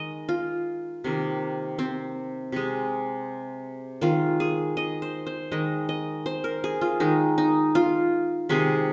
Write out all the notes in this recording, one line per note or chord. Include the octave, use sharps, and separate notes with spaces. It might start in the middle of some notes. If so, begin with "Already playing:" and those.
Already playing: D#3 G#3 D#5
F4
C3 D#3 A#3
C4
C3 G#3
D#3 G#3 F4
G#4
D#5
C5
C5
D#3 G#3 D#5
D#5
C5
A#4
G#4
F4
D#3 G#3 D#4
D#4
F4
C3 D#3 G#3 G#4